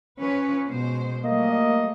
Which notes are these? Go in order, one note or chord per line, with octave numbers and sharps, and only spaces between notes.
F3 C#4 B4
B2 G#3 C5
F#3 G3 A3 A#3 D#5